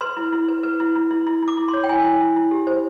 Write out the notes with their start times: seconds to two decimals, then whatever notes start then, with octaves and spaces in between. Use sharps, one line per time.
0.01 B4 C6
0.17 E4
0.33 E4
0.49 B4
0.63 B4
0.80 E4
0.95 E4
1.11 E4
1.27 E4
1.42 E4
1.48 D6
1.57 E4
1.68 C6
1.74 C#5
1.84 G5
1.89 E4 G#5
2.04 E4
2.21 E4
2.36 E4
2.51 G4
2.67 C5